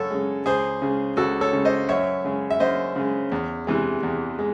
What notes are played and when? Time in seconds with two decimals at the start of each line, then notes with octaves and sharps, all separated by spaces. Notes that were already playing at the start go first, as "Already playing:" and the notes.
Already playing: F#2 C#3 A4 C#5
0.10 C#3 G#3
0.46 C#2 G#4 C5
0.82 C#3 G#3
1.17 C#2 F#4 A4
1.41 A4 C#5
1.53 C#3 G#3
1.65 C5 D#5
1.89 F#2 C#5 E5
2.24 C#3 G#3
2.51 E5
2.60 F#2 C5 D#5
2.96 C#3 G#3
3.32 E2
3.67 C3 E3 G#3
4.03 E2
4.39 G#3